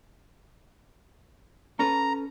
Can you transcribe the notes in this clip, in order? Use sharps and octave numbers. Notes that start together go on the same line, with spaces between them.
C#4 A4 B4 A#5